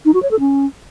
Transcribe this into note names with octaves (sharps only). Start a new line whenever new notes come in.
D#4
F#4
C#5
A4
C#4